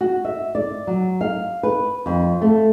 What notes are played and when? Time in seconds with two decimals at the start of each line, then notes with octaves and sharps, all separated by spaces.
0.01 F#4
0.25 E5
0.55 D5
0.87 F#3
1.21 F5
1.63 B4
2.06 F2
2.41 A3